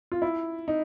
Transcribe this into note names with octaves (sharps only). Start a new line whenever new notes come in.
F4
E4
D#4